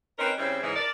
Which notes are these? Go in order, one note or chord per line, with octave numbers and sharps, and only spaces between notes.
C4 C#4 D#4 A#4 B4
C#3 G3 C4 C#4 E4
G#2 C#3 E3 G#3 D#4
D4 A#4 D5